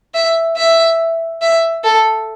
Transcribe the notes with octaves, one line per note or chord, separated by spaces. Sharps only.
E5
E5
E5
A4